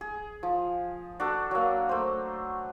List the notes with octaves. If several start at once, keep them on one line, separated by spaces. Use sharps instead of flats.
G#4
F3
D4 F#4 A4
F#3 A#3
A3 C5